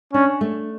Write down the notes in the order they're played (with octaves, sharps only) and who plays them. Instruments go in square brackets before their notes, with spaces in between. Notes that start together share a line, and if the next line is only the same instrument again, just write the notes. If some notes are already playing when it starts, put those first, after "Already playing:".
[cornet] C#4 [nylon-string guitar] D4
[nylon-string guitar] A3